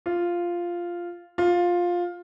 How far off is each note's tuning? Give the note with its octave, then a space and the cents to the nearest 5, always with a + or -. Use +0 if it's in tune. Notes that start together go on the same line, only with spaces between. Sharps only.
F4 -5
F4 +10